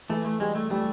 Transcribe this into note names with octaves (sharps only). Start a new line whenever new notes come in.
E3 A3
A3
G3 G#3
A3
G3 A3